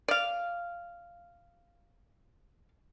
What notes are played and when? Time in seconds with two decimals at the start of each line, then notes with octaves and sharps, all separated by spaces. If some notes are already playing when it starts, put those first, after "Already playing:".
0.08 D5 F5